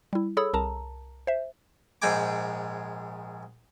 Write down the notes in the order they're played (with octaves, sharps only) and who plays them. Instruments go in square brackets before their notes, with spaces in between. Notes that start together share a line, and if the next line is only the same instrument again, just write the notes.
[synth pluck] G3 E4
G#4 A4 C#5 B5 D#6 E6
C2 A#4 A5 A#5
C5 E5
[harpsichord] A#1 G#2 G#3 G5 G#5 D6